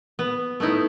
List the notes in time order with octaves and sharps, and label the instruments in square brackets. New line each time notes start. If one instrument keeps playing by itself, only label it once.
[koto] B3
A3 B3 D#4 E4